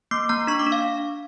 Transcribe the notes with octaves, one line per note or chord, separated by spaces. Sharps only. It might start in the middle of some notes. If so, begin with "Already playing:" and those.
A#3 D6
A#3 A#5
D4 C#6
D6
D4
F5